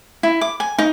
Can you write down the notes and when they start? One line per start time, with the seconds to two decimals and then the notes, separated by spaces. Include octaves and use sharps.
0.23 E4
0.41 D6
0.60 G#5
0.78 D#4